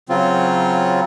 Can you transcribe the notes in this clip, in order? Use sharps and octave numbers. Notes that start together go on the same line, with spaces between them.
C#3 F#3 C4 F4